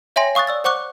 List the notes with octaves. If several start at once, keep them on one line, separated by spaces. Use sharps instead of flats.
C#5 E5 G5 G#5 C6 A#6
F5 C#6 D#6 F#6 A6
D5 E6 A6
C5 F#5 C#6 D6 F#6